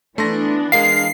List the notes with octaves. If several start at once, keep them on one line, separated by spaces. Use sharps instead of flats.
E3 A3 B3 D4 C6 A#6
G#3 A#4 F5 C7